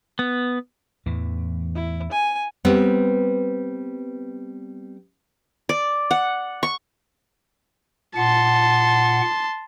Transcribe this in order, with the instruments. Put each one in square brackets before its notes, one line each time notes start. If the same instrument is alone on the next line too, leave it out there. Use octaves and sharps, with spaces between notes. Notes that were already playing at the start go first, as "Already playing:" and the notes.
[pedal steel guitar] B3
[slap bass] E2 A2 E3
[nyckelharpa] E4
G#5
[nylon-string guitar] G3 B3 C4
[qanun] D5
F#5
C#6
[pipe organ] A#2 F#5 [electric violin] A5 C6